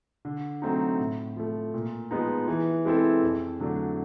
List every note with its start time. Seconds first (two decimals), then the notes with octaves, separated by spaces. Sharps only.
0.25 D3
0.62 F#3 A3 C4 D#4
1.00 A2
1.36 F3 A3
1.74 A#2
2.11 F3 G#3 B3 D#4
2.48 E3
2.85 G#3 C4 E4 A4
3.23 F2
3.59 D3 F#3 A3 D4